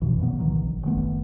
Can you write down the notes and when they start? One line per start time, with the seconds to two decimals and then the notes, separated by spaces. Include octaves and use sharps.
0.02 F2 B2 E3
0.20 A#2 C#3 B3
0.39 C2 D#3 E3 F#3
0.63 A#1
0.83 F#1 D#3 A3 B3